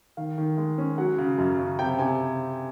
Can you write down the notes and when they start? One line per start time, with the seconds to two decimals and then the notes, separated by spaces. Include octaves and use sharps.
0.17 D#3 F5
0.38 D#3
0.57 G#3
0.78 C#4
0.98 F#3 F#5
1.18 C#3
1.38 F#2
1.59 C#3
1.79 C3 G5
1.99 C3 G#5